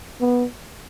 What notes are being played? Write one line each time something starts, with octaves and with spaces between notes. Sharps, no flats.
B3